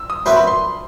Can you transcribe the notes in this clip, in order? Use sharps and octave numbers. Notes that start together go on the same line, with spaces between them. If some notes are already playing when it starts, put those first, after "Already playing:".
Already playing: E6
D#6
F#2 F#3 C4 E4 B4 C6
B5
C6